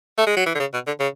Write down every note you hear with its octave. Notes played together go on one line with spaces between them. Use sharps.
A3
G#3
F#3
E3
D3
C#3
B2
D3
C#3